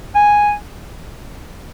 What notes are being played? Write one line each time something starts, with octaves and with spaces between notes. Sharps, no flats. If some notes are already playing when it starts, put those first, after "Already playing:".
G#5